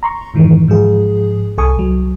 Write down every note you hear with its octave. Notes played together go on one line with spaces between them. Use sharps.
A#5 C6 C#6
F2 G#2 D#3 E3
G#2 F3 G#4
C2 A4 G#5 C#6 D#6
C2 F#3